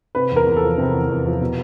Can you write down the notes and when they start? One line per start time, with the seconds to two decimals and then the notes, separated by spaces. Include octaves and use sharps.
0.15 C3 B4
0.31 E2
0.36 A#4
0.47 E2
0.57 A4
0.63 F3
0.78 C3
0.94 E2
1.09 E2
1.26 F3
1.41 B2